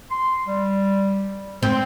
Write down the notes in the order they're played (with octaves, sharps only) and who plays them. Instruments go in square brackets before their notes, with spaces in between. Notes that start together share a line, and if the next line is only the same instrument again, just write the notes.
[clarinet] C6
G3
[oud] C4 [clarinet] C5